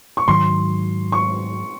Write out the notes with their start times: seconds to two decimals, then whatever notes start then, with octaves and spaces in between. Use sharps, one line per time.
0.17 C#6
0.28 G#2 D#3 F#3 C6
1.12 C#6